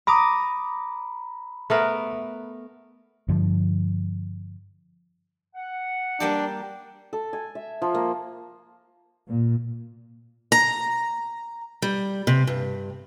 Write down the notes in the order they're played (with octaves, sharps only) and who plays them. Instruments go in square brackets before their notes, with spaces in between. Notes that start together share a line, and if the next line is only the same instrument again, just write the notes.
[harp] A#5 D6 D#6 [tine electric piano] B5
[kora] A3 B3 A#4
[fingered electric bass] G2 D3 F3
[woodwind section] F#5
[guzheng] G3 A#3 G4 [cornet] D4
[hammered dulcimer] A4
G#5
E5
F3
A#3
[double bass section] A#2
[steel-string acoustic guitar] A#5
G3
C3
G2